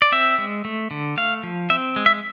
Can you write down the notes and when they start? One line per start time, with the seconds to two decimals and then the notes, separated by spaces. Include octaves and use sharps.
0.02 D5
0.12 C4 E5
0.38 G#3
0.65 A3
0.91 D3
1.17 A3 F5
1.43 F3
1.70 C4 E5
1.96 G#3
2.06 E5